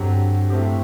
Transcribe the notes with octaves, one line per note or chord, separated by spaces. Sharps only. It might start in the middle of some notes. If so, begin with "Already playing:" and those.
Already playing: G2 D3 F#3 C4 G4
A2 A3 C4 G4